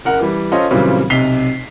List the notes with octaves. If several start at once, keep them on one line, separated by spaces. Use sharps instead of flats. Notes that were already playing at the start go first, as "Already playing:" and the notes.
F#1 A#4 F#5
E3 G3
C#4 F4 A4 C5 D#5
A#2 C#3 E3 F#3 G3 C4
B1 C3 B6 C7 F7 G7